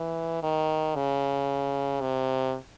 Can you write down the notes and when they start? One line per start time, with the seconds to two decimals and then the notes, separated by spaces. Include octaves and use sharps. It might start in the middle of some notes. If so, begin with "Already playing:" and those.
Already playing: E3
0.43 D#3
0.96 C#3
2.01 C3